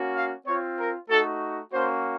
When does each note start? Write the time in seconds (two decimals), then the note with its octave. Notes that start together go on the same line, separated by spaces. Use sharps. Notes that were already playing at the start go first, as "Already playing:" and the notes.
Already playing: A#3 C#4 F#4
0.14 F5
0.46 C4 F4 C#5
0.78 A#4
1.09 A3 D#4 F#4 A4
1.72 A#3 C#4 F#4 C5